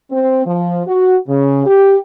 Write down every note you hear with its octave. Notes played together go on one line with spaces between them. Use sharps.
C4
F3
F#4
C#3
G4